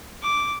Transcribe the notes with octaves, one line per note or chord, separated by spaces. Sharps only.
D6